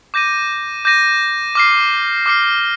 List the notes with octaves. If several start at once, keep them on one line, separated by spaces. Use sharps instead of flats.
D6 G6 A#6 D#7
D6 G6 A#6 D#7
D6 F6 C7
D6 F6 C7